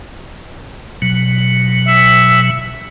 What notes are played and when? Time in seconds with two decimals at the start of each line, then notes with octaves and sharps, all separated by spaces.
1.02 B2 F#3
1.88 E5